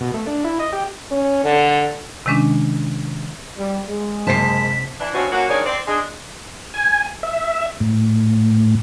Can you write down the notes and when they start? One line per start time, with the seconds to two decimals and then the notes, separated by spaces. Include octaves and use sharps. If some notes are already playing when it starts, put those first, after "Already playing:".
0.01 B2
0.14 A3
0.27 D4
0.44 E4
0.59 D#5
0.73 G4
1.11 C#4
1.44 D3
2.26 C3 D#3 G#3 C#4 D4
3.58 G3
3.88 G#3
4.27 F#1 C3 C5 A5 B6 C7
5.00 E3 D4
5.14 G2 B2 C4 C#4 F#4
5.32 F#3 A#3 C#4 F#4
5.49 G2 D#3 G#3 C#4 C#5 D5
5.66 C4 D5
5.87 G#3 D4
6.74 G#5
7.23 E5
7.80 A2